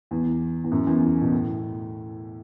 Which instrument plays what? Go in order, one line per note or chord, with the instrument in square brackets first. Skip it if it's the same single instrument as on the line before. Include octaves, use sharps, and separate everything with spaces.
[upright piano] E2
E2
F#2
E2
B2
A2